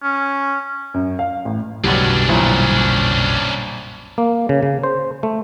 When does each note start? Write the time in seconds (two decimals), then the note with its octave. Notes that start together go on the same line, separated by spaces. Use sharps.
0.03 C#4
0.94 F#2
1.19 F5
1.45 A1
1.84 F#1 B1 B2 D3 F#3 G3 C#4 D4
2.29 C2 F#2 A#2
4.18 A#3
4.49 C#3
4.63 C#3
4.84 C5
5.23 A3